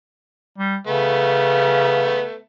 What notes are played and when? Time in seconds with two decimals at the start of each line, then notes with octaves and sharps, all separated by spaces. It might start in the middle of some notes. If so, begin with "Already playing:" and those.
0.58 G3
0.87 C#3 A3 B3